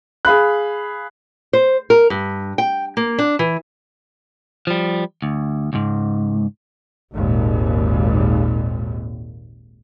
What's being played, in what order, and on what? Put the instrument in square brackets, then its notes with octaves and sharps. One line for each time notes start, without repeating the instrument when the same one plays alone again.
[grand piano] G#4 F5 B5 F#6
[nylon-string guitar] C5
A#4
G2
G5
A#3
D4
E3
[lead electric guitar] F3 G3
D2
C#2 G#2
[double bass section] G#1 D#2 A#2